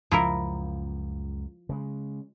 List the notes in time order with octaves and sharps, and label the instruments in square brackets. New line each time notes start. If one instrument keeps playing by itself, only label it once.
[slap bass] C#2 F#2 [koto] F3 E4 A#4
[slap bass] C#3 G#3